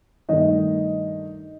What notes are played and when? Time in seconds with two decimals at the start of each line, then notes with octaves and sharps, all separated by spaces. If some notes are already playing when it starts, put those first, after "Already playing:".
0.29 G2 D#3 A3 D#4 D#5